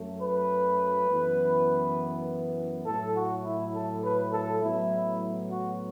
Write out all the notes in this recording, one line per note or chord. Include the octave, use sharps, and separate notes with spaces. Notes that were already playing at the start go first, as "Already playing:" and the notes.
Already playing: F#2 F#3 A3
B4
F#2 E3 B3
A2 F#3 A3 A4
F#4
E4
A4
B4
A4
A2 F#3 B3 E4
F#4